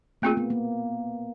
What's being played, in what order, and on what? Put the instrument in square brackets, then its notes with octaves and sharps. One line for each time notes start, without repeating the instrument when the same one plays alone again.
[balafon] A3 C4 F4 G#4 [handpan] A#3
[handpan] B3
A#3